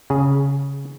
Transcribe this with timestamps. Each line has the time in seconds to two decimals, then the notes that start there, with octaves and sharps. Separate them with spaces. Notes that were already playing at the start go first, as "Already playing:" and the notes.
0.10 C#3 G#4